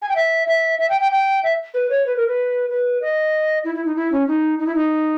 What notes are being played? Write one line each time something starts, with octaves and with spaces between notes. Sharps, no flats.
G#5
G5
E5
E5
E5
G5
G5
G5
E5
B4
C#5
B4
A#4
B4
B4
D#5
E4
E4
D#4
E4
C#4
D#4
D#4
E4
D#4